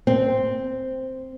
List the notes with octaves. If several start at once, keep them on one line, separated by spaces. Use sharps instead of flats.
C4